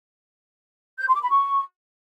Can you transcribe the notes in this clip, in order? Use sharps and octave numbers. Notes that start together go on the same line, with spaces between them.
G6
C6
D6
B5
C#6